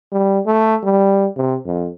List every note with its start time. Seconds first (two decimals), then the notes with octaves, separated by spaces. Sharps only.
0.12 G3
0.46 A3
0.83 G3
1.36 C3
1.66 F2